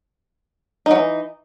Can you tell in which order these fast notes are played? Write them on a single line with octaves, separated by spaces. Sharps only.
D#4 F#3 E3